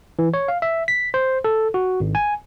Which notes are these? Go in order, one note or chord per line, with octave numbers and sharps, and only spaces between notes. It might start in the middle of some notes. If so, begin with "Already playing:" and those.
E3
C#5
F5
E5
B6
C5
A4
F#4
G#1
G#5